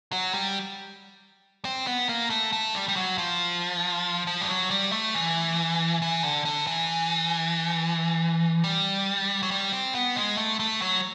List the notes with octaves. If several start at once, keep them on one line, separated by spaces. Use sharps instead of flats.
F#3
G3
C4
B3
A#3
A3
A3
G3
G3
F#3
F3
F3
G3
F#3
G3
A3
E3
E3
D3
D3
E3
G3
F#3
G3
C4
B3
G#3
A3
A3
F#3